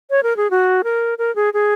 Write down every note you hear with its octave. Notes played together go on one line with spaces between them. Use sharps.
C#5
A#4
G#4
F#4
A#4
A#4
G#4
G#4